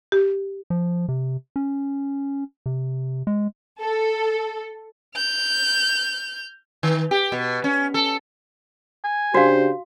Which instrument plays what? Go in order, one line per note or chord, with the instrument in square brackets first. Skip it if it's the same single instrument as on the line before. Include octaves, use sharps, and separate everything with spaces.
[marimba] G4
[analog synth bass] F3
C3
C#4
C3
G#3
[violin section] A4
[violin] F6 G6
[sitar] D#3
G4
B2
C#4
A4
[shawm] G#5
[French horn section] C#3 D4 G4 [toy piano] F#4 F5 [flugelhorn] C5